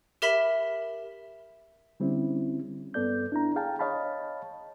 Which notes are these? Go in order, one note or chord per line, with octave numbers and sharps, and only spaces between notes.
G4 A#4 E5 B5 B6 E7
D3 G3 C4 C#4 E4
G2 B3 A4 D5 G6
D4 E4 A#5
G#4 F5 G5 A5
C#5 D#5 F5 A5 B5